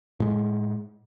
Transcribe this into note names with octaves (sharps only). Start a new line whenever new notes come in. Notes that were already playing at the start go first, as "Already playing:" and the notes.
A2 G#3